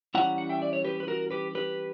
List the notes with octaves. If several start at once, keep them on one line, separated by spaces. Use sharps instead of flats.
E3 G3 C#4 E4 F#5 A#5
F#5
E5 G5
D5
C#5
G4 B4
B4
F#4 A#4
G4 B4
G4 B4